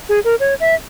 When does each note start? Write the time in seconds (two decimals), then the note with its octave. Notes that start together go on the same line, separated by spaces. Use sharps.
0.09 G#4
0.24 A#4
0.40 C#5
0.60 E5